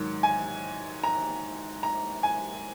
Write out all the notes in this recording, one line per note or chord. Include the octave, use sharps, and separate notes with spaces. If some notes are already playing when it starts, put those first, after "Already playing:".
Already playing: G#2 D#3 F#3
G#5
A#5
A#5
G#5